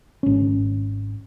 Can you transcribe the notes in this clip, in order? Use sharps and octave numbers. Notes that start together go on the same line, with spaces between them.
G#1 C#4